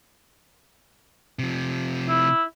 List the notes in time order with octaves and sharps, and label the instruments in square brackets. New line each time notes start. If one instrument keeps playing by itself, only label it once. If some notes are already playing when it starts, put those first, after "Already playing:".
[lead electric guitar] C3 F3
[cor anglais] E4